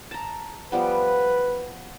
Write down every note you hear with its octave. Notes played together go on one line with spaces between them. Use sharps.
A5 A#5
F3 G3 B3 B4